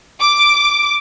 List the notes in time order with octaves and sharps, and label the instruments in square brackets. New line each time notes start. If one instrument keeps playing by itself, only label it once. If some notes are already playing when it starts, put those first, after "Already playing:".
[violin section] D6